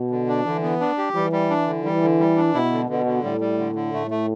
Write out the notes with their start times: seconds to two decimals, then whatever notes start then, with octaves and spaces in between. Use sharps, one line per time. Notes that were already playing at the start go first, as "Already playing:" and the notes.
Already playing: B2
0.11 D3
0.28 D4
0.45 D3 E3
0.63 B3
0.80 D4
0.98 G4
1.15 E3 G3
1.32 G3
1.50 D4
1.67 D3
1.84 E3 G3
2.02 D3
2.19 G3
2.37 D4
2.54 B2 E4
2.72 D3
2.89 B2 D3
3.06 D3
3.23 A2 G3
3.41 G3
3.59 D3
3.75 D3
3.94 A2 A3
4.11 A3